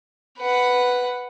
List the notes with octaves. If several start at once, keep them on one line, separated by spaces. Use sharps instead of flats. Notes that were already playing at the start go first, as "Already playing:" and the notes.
B4 F#5